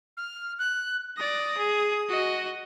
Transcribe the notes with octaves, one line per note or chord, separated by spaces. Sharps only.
F6
F#6
D5 D#6 A#6
G#4
F#4 D#5